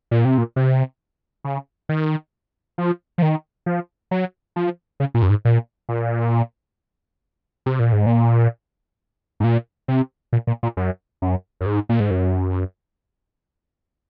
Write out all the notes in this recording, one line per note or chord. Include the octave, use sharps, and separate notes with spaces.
A#2
C3
A#2
C3
C#3
D#3
F3
F3
D#3
F3
F#3
F3
C#3
A#2
F#2
G#2
A#2
A#2
C3
A#2
G#2
A#2
G#2
A#2
C3
A#2
A#2
A#2
F#2
F#2
F#2
G#2
A#2
G#2
F#2